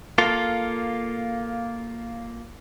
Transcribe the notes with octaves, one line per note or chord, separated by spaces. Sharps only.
A#3 F4 A4